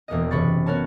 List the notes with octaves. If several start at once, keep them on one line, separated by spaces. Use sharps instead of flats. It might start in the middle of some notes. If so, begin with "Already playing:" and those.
E1 E2 A#3 D#5
F#1 C3 B5 C#6 A6
B3 F#4 A#4 C#5 A5